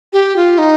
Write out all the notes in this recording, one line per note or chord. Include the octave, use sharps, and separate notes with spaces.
G4
F4
D#4